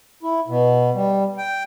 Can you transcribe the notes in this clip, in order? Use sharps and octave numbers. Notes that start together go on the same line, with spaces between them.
E4
B2
G3
G5